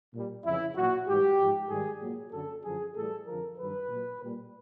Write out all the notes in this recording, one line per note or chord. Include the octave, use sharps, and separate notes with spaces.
A#2 G3
F2 C#3 E3 E4
A#2 F#3 F#4
G#2 E3 G3 G4
G#2 F3
G#2 D#3 G3 G#4
A#2 F#3
F#2 D3 F#3 A4
F#2 D3 F3 G#4
A2 E3 G3 A4
F2 D3 F3 A#4
G2 D#3 F#3 B4
A#2 F#3
A#2 G3